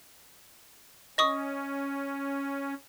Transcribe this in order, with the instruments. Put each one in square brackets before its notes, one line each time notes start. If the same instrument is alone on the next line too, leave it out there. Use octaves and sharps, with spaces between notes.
[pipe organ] C#4 [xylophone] D#5 C#6 D#6